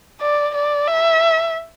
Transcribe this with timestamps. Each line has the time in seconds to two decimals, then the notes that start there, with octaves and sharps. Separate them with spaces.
0.21 D5
0.55 D5
0.88 E5